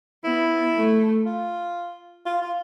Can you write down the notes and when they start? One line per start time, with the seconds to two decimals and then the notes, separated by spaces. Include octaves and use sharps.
0.24 B3 E4
0.75 A3
1.26 F4
2.26 F4
2.42 F4